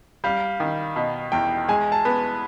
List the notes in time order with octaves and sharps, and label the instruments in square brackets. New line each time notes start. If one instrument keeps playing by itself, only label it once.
[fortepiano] G3 [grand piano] F5
[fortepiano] D#3
B2
[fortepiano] E2 [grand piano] G5
[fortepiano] G#3 [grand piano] G#5
[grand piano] A5
[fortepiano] B3